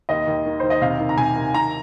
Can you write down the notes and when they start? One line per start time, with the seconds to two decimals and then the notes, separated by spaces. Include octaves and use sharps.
0.09 D#2 D#5
0.27 D#2
0.46 D#3
0.60 D#2 C5
0.70 D#5
0.81 C3 F5
1.00 D#3
1.09 A#5
1.17 C3 G#5
1.36 D#3
1.54 D#3 A#5